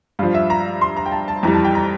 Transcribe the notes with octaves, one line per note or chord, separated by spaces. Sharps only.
G2 F3 F5
E5
A#5
C6
A#5
G5
A5
A5
F2 E3 G3 A#5
A5
G5
A#5